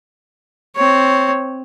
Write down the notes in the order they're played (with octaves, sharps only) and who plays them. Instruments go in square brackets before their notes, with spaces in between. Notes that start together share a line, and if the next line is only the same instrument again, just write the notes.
[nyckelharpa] C4 C#5